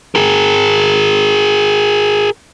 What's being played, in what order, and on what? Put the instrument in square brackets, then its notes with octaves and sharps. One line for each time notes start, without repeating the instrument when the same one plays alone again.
[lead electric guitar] G#4 A#4